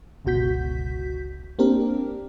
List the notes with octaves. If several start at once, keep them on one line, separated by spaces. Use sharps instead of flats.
G1 C#2 B2 F#4 G6 B6
A#3 C4 D4 G4 A#4